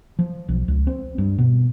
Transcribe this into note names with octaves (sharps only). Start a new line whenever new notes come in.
F3
B1
C#2
C4
G2
B2